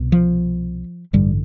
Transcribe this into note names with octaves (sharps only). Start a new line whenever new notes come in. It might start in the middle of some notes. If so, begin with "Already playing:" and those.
Already playing: C2 B2
F3
A1 G2 D3 G3